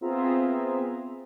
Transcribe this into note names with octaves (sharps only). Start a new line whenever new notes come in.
B3 C4 F4 G#4 E5 A#5